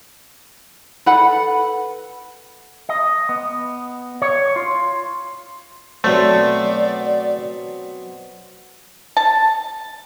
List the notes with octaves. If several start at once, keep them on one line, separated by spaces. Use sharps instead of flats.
A4 B4 F#5 B5
D#5
B3
C#5
F4
B2 F#3 A3 C4 D5
A5